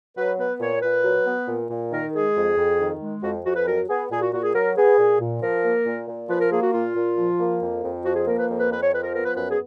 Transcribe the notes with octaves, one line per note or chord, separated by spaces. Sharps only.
F#3 B4
B3 B4
A#2 C#5
A#2 B4
F#3
B3
A#2
A#2
D#3 A#4
G#3 G#4
F2
F2
D#3
G#3
F2 F#4
F2 F#4
B4
F#3 A#4
B3 G#4
A#2 G#4
F#4
A#2 F#4
G#4
F#3 A#4
B3 G#4
A#2
A#2
F3 A#4
A#3
A#2
A#2
F3 B4
A#4
A#3 G#4
F#4
A#2 F4
A#2
F3
A#3
F2
F2
F3 F#4
G#4
A#3 A#4
B4
F2
B4
F2 B4
C#5
F3 B4
A#4
B3 A#4
B4
F#2 B4
G#4